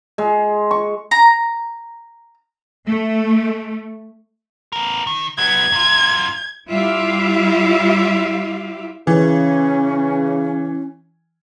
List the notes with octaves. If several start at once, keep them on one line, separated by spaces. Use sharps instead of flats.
G#3
C#6
A#5
A3
B3 A#4
D#3
F#3 B3 G#6
F#2 F4
G3 E4 F4 G4 E5 F5
C#3 E3 C#4